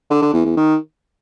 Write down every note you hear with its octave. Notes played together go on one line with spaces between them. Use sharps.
D3
D3
E2
E2
D#3